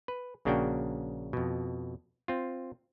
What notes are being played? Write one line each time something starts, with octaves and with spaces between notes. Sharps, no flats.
B4
A#1 C#3 A#3 D4 F#4 G5
F2 B2
C4 F4